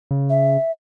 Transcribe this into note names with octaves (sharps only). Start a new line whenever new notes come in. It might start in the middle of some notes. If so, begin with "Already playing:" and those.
C#3
E5